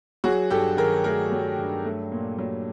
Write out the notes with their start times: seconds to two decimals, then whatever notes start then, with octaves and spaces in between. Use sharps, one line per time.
0.24 F#3 F#4 G#4
0.50 G2 G4 A4
0.77 D#3 G#4 A#4
1.04 A3 G#4 A#4
1.32 F#3
1.59 G2
1.85 A3
2.12 A#2
2.39 F#3